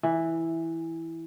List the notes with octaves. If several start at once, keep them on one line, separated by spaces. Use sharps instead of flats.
E3